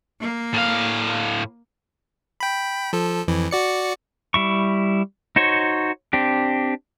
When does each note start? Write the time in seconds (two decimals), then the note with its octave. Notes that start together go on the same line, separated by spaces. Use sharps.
0.20 A#3
0.54 A2 F5
2.40 G5 B5
2.93 F3 A4
3.28 F2 E3
3.51 F#4 D5 C#7
4.34 G3 E4 C#6
5.36 D#4 F#4 C5 C#5
6.13 C4 D4 G4